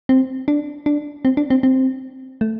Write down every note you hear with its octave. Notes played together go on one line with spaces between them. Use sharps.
C4
D4
D4
C4
D4
C4
C4
A3